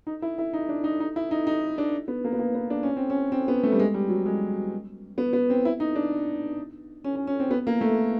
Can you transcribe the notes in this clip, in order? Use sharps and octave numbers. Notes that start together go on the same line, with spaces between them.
D#4
E4
E4
D#4
D4
D#4
D#4
E4
D#4
D#4
D4
B3
A#3
B3
A#3
B3
D4
C#4
C4
C#4
C4
B3
A3
G3
G#3
G3
F#3
G#3
B3
B3
C4
E4
D#4
D4
C#4
C#4
C#4
C4
B3
A#3
A3